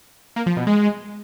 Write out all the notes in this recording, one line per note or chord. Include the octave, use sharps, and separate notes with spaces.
A#3
F3
B2
G#3